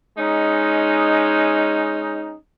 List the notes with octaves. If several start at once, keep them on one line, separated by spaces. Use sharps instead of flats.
G#3 C#4 D#4